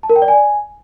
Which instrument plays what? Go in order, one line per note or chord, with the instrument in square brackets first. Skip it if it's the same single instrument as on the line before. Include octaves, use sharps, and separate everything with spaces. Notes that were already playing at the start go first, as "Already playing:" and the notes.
[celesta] A5
A#4
G5
D5
G#5